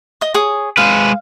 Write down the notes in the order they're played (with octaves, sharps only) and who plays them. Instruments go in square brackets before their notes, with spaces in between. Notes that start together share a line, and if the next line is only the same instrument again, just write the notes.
[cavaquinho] D#5 D#6
G#4 C#5 D#6
[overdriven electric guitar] G#3 B4 [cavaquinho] F5